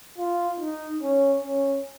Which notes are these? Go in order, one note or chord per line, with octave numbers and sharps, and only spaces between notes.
F4
D#4
C#4
C#4